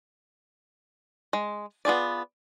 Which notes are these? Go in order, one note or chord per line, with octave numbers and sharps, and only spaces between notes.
G#3
B3 F4 G#4 D5